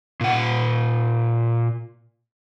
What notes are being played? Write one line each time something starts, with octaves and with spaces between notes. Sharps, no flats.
A#2 F#5